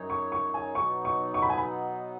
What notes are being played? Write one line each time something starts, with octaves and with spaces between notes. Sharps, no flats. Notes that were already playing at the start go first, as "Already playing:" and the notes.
Already playing: F#2 F#3 D#4 G#4 C#5
C#6
C#6
G#5
B2 F#3 B3 D#4 C#6
C#6
C#6
B5
G#5
B5